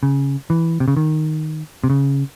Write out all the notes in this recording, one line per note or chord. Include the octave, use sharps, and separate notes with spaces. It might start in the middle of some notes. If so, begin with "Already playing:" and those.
C#3
E3
C3
C#3
D#3
C3
C#3